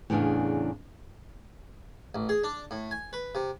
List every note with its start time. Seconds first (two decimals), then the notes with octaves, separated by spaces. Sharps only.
0.10 E2 A2 C#3 D4 G#4 F5
2.15 A1
2.29 G#4
2.44 D4
2.71 A2
2.91 G#5
3.13 B4
3.35 C3